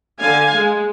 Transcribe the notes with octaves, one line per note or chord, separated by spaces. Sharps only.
D3 F5 G#5
G#3